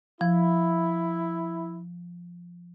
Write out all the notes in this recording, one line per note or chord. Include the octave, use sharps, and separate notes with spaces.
F3 E4